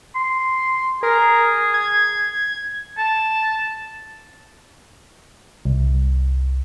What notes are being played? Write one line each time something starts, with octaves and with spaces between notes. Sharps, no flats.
C6
G#4 A#4
G#6
A5
C2